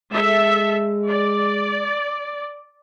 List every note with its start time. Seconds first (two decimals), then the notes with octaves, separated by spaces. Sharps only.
0.12 G#3 A4 E5
1.08 D5